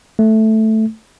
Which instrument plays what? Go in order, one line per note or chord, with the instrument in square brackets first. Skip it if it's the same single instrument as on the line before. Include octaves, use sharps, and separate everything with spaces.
[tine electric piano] A3